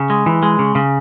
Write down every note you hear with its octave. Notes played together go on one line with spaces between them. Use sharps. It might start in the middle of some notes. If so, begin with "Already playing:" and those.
Already playing: C#3
G#3
E3
G#3
C#3
C#3